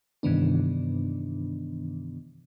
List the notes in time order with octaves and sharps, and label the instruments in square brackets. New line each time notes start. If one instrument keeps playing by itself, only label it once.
[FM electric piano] G2 C3 D#3 E3 B3 D4